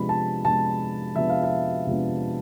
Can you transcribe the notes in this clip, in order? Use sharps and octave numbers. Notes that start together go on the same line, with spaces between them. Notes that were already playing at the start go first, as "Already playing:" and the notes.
Already playing: C3 F3 G#3 B3 D4 B5
A5
C3 F3 G#3 B3 D4 A5
C3 F3 G#3 B3 D4 E5
F5
E5
C3 F3 G#3 B3 D4